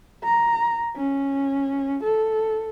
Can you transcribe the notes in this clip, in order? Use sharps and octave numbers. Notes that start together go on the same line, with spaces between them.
A#5
C#4
A4